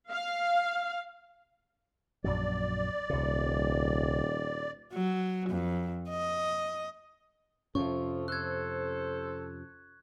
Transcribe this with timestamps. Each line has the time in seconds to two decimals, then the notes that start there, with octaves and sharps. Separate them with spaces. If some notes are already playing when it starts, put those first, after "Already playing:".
0.10 F5
2.24 A#1 F#2 F#3 D5
3.10 D#1 C2 C3
4.93 F#3
5.49 F2
6.09 D#5
7.75 F2 C3 F3 C#4 A4 C#6
8.28 A4 C5 F#6 G#6